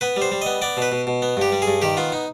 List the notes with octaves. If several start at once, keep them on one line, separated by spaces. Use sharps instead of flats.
B3 B4
G3
C5
G3
B3 D#5
B3 D5
B2 B4
B2
B2
B3
G2 G4
G3
G#4
G2
D#3 G4
B3 F4
D#4